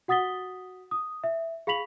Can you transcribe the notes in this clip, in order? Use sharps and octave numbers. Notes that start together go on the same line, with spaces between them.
F#4 F#5 D#6 A6 B6 G7
D#6
E5
G#4 F5 B5 B6 F7 F#7